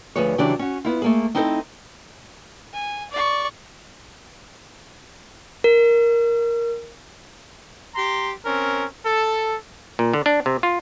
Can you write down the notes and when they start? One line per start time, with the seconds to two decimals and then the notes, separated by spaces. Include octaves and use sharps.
0.16 D2 F3 G#4 B4 C#5
0.38 C#3 E3 F#3 D4 G4
0.59 C#4 F#4
0.85 B3 E4 F4
1.02 A3 A#3 G#4
1.35 C4 D#4 E4 A4 B4 C5
2.73 G#5
3.11 D5 C#6
5.64 A#4
7.94 G4 A#5 C6
8.44 C4 C#4 A#4
9.05 A4
9.99 A#2
10.13 D3
10.26 D4
10.46 C3
10.63 F4